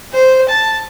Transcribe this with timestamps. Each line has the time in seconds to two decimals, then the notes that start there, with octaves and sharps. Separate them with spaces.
0.13 C5
0.49 A5